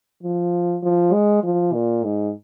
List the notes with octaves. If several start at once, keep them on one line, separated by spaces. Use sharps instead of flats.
F3
F3
G#3
F3
A#2
G#2